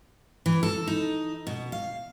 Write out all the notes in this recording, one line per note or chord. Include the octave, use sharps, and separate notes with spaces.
E3
A4
D#4
B2
F5